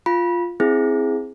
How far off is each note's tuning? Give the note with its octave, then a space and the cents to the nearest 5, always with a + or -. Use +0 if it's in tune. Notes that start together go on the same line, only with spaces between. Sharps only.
F4 +0 B5 -25
C4 +5 E4 +0 G#4 +0